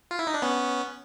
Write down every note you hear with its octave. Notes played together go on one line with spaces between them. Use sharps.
F4
E4
D#4
D4
B3 C#4